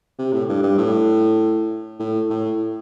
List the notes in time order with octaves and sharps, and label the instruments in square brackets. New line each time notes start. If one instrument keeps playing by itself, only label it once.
[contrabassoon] C3
A2
G2
G2
A2
A2
A2